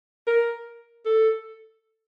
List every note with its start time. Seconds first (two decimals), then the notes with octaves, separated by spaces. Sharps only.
0.27 A#4
1.05 A4